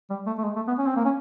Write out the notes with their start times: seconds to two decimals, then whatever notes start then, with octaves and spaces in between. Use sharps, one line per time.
0.10 G3
0.26 A3
0.38 A3
0.44 G#3
0.56 A3
0.68 B3
0.78 C#4
0.86 C4
0.96 A#3
1.05 C#4